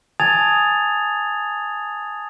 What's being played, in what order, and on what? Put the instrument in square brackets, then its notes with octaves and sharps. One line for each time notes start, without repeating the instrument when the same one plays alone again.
[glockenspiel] G#5 A5 D#6 G#6 A6 F7